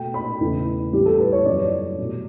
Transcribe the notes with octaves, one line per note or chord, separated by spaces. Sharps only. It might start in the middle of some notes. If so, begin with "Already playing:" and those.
Already playing: B2 A3 G5
B5
E2 C#3 E3 A3
A2 E3 G3 G4
A4
B4
C#5
F#2 E3 G3 D5
B2 A3